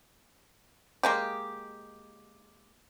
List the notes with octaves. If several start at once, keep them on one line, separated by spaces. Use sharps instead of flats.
G#3 A#3 G4